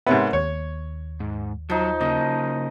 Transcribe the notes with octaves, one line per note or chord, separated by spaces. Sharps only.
G#2 C3 B3 A#4 C#5 E5
D#2 C#5
G#2
F3 F#3 D#4
C#3 A#3 D#5